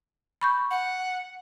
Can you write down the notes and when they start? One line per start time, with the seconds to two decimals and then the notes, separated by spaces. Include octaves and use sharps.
0.41 B5 C#6 G6
0.71 F#5